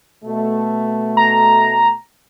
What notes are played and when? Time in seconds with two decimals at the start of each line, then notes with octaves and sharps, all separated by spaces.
0.24 B2 A3
1.17 A#5